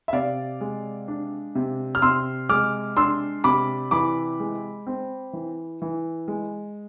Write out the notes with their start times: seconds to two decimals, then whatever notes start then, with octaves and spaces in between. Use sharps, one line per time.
0.08 E5
0.13 C3 D5 F5
0.61 G#3
1.08 D4
1.55 C3
1.95 F6
2.02 C3 C6 E6
2.49 G#3 D6 F6
2.97 D4 C6 E6
3.44 C3 B5 D6
3.91 E3 B5 D6
4.40 G#3
4.87 C4
5.33 E3
5.82 E3
6.28 G#3